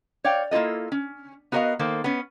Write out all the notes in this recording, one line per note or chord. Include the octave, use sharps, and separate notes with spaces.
C#5 D5 F5 G5
A#3 E4 F4 A4 D#5
C#4
B3 F#4 A#4 C5 D#5 F5
D#3 A#3 A4 C5
B3 C#4